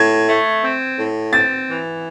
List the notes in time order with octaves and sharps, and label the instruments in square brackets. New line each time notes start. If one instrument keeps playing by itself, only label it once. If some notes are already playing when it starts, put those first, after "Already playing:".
Already playing: [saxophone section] A2 [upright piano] G#6
[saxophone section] A3
C4
A2
[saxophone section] C4 [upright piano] A6
[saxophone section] E3